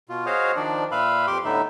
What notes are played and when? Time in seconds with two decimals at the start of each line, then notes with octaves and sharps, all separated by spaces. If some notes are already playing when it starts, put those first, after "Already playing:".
0.09 B2 F4
0.26 F#4 G#4 C5 C#5 D#5 F5
0.56 D#3 F3 D4 D5
0.92 A#2 B4 E5 F5 B5
1.27 F2 G4 C6 D6
1.44 A2 D3 B3 D#4 E5